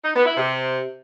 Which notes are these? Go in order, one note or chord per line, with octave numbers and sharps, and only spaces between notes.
D#4
B3
E4
C3